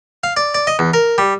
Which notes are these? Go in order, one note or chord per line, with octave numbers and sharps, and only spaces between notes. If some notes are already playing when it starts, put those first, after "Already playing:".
F5
D5
D5
D#5
E2
A#4
G3